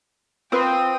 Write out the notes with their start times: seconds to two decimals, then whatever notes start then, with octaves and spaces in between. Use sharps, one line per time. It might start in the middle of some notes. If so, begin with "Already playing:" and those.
0.52 C4 F4 B4 G5 D#6